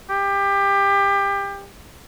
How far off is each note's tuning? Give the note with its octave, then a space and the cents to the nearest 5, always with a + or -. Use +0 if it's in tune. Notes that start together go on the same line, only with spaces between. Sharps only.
G4 +25